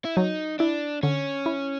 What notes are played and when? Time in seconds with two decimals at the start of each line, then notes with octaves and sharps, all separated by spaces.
0.05 E4
0.16 F#3 D#4
0.59 D4 E4
1.03 D3 C#4
1.46 E4